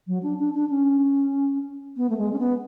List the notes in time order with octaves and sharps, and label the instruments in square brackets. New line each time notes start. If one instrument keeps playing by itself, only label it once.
[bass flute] F#3
D4
D4
D4
C#4
B3
A3
G#3
C#4
B3